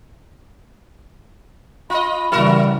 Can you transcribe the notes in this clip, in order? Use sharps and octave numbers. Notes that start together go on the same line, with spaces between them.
F4 D#5 B5
C#3 E3 G3 E4 F#4 A#4